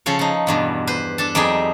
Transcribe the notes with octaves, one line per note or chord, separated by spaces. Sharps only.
C#3 F3 A4 C#5
F3 D#4
E2 G2 B2
B4 C5
D4 A4 A5
F2 G3 D#4 G#4 E5